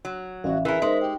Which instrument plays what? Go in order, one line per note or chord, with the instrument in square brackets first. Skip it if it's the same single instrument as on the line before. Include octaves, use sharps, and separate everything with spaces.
[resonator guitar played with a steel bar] F#3
[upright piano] A1 [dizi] F#4 [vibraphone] E5 F5
[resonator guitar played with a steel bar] E3 A#4 [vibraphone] G#4 [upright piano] B4 [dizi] E5
[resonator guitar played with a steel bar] G#3 [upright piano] D#4 [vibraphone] A#4 C5
[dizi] G4 [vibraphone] G5